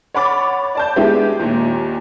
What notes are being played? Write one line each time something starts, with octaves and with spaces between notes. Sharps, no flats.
C#5 F#5 B5 D6 A6
D5 A5 G6
G#3 B3 D4 E4 G4
D#2 A#2